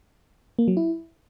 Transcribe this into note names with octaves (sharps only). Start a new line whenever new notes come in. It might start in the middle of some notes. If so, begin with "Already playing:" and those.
A#3
F#3
E4